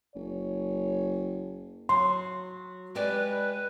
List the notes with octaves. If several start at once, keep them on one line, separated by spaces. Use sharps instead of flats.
F#1 C#5
F#3 C6
G#3 G4 B4 D5